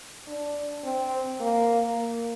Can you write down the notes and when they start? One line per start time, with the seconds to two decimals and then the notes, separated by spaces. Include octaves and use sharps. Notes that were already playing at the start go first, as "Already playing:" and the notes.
0.27 D4
0.84 C4
1.40 A#3
1.95 A#3